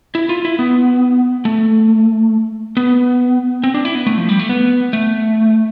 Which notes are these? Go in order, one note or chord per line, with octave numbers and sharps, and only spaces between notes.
E4
F4
E4
B3
A3
B3
C4
D4
E4
B3
A3
F3
G3
A3
B3
A3